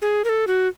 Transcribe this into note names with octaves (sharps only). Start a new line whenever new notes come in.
G#4
A#4
A4
F#4